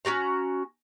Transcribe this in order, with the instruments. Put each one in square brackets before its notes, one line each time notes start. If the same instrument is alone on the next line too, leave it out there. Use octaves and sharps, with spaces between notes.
[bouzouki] C#4 F4 F#4 A#5